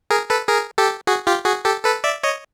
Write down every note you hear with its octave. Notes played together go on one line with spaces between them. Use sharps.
G#4 A#4
A4 B4
G#4 A#4
G4 A4
F#4 G#4
F4 G4
F#4 G#4
G4 A4
A4 B4
D5 E5
C#5 D#5